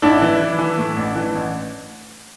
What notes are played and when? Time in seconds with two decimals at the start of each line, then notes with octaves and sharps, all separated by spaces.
0.02 A1 D4 E4
0.21 E3
0.41 E3
0.59 E3
0.78 A2
0.97 A1
1.15 E3
1.35 A1